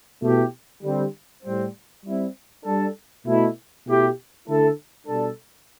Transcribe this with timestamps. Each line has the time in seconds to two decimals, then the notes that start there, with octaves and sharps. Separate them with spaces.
0.21 B2 A3 E4 G4
0.83 D3 G3 C4
1.43 A2 G3 C4
2.04 G3 C4 E4
2.65 G3 D4 A4
3.25 B2 A3 E4
3.87 B2 A3 E4 G4
4.47 D3 A3 E4 A4
5.07 B2 G3 D4 A4